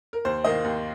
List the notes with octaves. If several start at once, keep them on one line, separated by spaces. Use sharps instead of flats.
A#4
D#2 C5
D#3 A#3 D#5
D#2